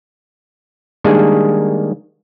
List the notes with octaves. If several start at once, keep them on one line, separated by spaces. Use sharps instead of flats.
D#3 G3 G#3 A#3 D4 G#4